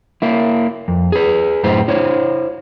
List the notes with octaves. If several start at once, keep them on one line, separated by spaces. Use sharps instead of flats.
A#3 E4
F2
G#4 B4
F#2 A2 E4 C5
E4 C5 C#5